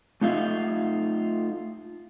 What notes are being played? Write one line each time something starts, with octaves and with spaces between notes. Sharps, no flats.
A3 D#4 F4 E5 F5